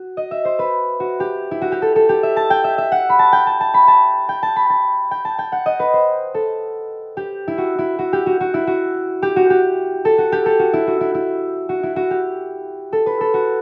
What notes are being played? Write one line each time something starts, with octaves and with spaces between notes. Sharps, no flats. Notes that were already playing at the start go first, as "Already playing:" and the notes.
Already playing: F#4
D#5
E5
C5
B4
F#4
G4
E4
F#4
G4
A4
A4
G4
E5
A5
G5
E5
E5
F#5
B5
A5
G5
A5
A5
B5
A5
G5
A5
B5
A5
G5
A5
G5
F#5
D#5
B4
C5
A4
G4
E4
F#4
E4
F#4
G4
F#4
F#4
E4
F#4
G4
F#4
G4
A4
F#4
G4
A4
F#4
E4
F#4
E4
E4
F#4
E4
F#4
G4
A4
B4
A4
F#4